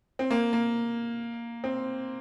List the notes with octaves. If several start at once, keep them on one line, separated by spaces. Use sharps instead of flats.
C4
A#3
A#3
C4